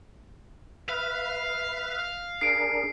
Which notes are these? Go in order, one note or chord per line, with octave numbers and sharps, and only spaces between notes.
B4 E5 F5
D4 G#4 A#4 C7 D7